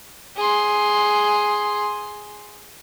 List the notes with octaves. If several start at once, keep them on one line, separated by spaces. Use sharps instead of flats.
G#4 C6